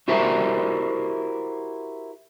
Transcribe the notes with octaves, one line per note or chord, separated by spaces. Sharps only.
E4 F#4 G4 A#4 C5 E5